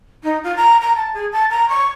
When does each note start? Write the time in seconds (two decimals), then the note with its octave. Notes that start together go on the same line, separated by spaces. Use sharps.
0.24 D#4
0.44 F4
0.56 A#5
0.81 A#5
0.96 A5
1.14 G#4
1.32 A5
1.50 A#5
1.69 C#6